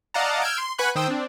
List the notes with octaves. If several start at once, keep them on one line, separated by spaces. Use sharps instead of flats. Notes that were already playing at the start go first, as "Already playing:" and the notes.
D5 D#5 F5 F#5 A5 A#5
E6 F6 G6 G#6 D7
C6
B4 F#5 G#5 B5 C#6 F#6
D#3 C5 G5 D#6 E6
C4 D4